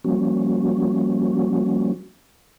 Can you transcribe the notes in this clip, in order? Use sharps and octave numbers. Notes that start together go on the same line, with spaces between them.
F3 G3 A#3 C#4 F#4